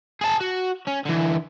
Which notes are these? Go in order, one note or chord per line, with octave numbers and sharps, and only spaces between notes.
G#4 A5
F#4
C#4
D3 E3